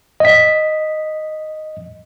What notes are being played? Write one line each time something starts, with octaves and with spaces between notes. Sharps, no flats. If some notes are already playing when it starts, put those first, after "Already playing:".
D#5 B6